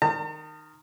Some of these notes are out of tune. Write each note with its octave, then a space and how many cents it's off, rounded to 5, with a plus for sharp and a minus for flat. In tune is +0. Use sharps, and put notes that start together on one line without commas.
D#3 -10 A5 +45